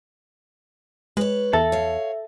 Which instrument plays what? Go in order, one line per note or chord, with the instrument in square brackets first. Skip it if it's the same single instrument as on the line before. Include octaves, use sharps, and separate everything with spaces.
[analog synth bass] G#3 [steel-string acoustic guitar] B4 C#5
[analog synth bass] E2 [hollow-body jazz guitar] A4 [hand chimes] E5
[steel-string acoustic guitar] C#5 F5